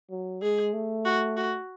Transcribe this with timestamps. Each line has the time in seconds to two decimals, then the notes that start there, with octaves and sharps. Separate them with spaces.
0.10 F#3
0.42 G#3 G#4
0.73 A3
1.05 F#4
1.37 F#4